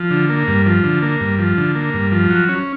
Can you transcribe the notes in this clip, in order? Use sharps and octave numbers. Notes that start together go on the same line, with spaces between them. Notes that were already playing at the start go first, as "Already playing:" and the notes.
Already playing: F3
D3
A#3
G2
F3
D3
A#3
G2
F3
D3
A#3
G2
F3
F#3
C#4